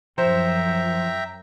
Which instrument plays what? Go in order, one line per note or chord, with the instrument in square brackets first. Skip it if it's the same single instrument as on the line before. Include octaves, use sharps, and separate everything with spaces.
[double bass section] F#2 [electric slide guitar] F3 [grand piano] C5 [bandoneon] E5 G5 A#5